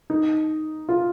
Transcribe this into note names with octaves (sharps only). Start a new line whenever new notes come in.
D#4
F4